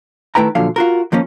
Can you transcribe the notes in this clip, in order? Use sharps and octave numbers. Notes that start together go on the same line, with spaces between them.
D#3 A3 E4 B4 G5 A#5
A#2 D3 F3 F#3 F5
F4 F#4 A#4
D#2 F3 A#3 C#4